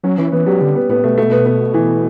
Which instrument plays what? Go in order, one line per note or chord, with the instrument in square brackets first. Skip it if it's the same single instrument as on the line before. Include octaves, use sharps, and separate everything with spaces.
[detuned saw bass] F#3 [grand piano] C#4
[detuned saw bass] E3 [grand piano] C#4
[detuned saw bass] E3 [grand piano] B3
[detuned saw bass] F#3 [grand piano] G3
[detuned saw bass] D3 [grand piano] G3
[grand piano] B3
[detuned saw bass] A2 [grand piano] B3
[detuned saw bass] B2 [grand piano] A3
[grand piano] A3
B3
B3
E3